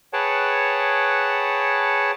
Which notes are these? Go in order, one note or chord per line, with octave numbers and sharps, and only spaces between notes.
G#4 B4 C#5 F#5 G5 A5